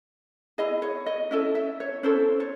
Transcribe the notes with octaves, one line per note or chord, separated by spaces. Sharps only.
E4 G#4 D#5
C#5
D#5
C#4 E4 A4 D#5
E5
C#5
C#4 E4 A4 C5
C#5